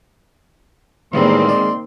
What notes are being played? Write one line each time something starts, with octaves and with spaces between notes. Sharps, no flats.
E2 A2 D#3 G3 G#3 A#3 C4 C6
D5